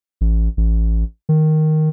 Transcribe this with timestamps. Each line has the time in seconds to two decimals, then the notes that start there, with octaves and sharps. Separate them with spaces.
0.21 A1
0.57 A1
1.29 D#3